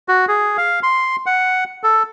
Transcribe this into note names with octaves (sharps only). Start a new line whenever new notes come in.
F#4
G#4
F5
C6
F#5
A4